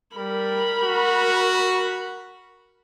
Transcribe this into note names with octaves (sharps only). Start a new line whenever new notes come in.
G3 A#4 B5
F#4